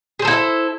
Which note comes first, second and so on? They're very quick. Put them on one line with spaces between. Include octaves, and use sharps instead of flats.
G#4 C5 A4 E4